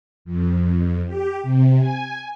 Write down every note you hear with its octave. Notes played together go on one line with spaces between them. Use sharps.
F2
G4
C3
G#5